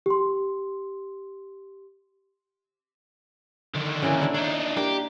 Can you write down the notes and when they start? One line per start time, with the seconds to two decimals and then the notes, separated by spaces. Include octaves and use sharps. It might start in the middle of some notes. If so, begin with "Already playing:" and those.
0.06 G4 C6
3.75 D3 D#3
4.02 C#3 E3 A#3
4.21 D4 E4
4.34 D4 D#4 C#5
4.77 A#3 D4 G4